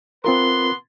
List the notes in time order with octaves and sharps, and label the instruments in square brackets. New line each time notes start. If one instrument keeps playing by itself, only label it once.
[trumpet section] B3 B4 C6 [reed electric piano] C4 F4 A#4